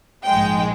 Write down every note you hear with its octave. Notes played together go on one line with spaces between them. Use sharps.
A#1 G#2 F3 G#3 G5